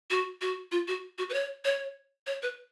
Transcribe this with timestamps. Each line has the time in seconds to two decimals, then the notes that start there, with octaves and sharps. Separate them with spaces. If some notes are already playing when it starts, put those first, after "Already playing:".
0.10 F#4
0.41 F#4
0.72 F4
0.88 F#4
1.18 F#4
1.30 B4
1.34 C#5
1.65 C#5
2.27 C#5
2.42 B4